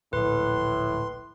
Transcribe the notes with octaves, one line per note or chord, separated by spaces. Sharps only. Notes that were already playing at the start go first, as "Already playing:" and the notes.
D1 A#1 A2 B4 C6